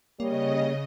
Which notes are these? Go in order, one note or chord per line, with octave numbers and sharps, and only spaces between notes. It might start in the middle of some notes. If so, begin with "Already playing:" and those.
C#3 G3 A#3 C#5 D#5